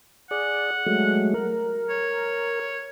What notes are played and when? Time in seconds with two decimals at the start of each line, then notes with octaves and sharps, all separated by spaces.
0.31 G#4 D5 F#5
0.86 F#3 G#3 A3
1.34 A#4
1.90 C#5